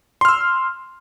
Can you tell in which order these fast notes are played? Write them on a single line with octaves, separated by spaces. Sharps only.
C6 F6 E6